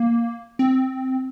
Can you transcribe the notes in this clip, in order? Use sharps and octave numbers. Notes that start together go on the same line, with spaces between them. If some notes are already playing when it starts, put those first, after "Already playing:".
Already playing: A#3
C4